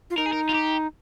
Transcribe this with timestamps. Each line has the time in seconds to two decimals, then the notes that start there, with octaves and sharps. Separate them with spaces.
0.10 F4
0.17 D#4 A#4
0.26 G#4
0.33 A#4
0.49 F4
0.54 G4